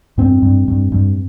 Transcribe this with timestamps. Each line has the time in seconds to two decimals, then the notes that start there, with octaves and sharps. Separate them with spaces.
0.18 G2 C4
0.43 G2
0.68 G2
0.92 G2